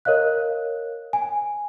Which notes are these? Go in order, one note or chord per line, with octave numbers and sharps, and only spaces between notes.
A#4 C#5 D#5 F5 F#6
G#5